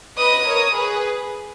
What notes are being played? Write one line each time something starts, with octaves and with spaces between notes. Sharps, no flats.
B4 D#5 D#6
A#4 C#5
G#4 B4